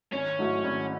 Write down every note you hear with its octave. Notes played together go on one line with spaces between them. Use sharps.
G#1 C#4
G#2 F#3 A3 E4
G#1